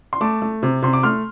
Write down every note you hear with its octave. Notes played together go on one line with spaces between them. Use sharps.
C6
A3 A5 D6
A3
C3
C3 C6
D6
A3 C6 F6